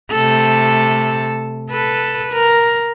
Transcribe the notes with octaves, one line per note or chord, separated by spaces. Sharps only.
C3 A3 A4
A4 B4
A#4